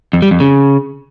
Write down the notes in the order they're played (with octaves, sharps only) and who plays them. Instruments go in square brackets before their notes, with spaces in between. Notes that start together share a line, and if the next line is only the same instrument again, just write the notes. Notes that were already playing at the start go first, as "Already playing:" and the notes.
[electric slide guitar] F2
G3
F2
C#3